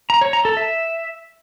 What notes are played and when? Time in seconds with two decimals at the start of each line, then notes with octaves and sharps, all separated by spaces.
0.10 A#5
0.21 C#5
0.33 A#5
0.45 A4
0.57 E5